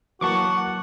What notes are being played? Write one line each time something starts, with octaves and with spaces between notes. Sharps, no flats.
E3 F#3 A#3 F#4 F#5 A5 C#6 D6